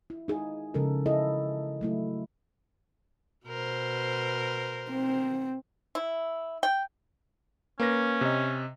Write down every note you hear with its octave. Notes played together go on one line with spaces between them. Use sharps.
E4
D#4 G#4
C#3 F3 G#3 A4 A#4
E4 G#4 A4 D#5
F#3 A3 E4
B2 A#4 C5
C4
E4
G5
A#3 C#4 B4 A#6
C3 D#5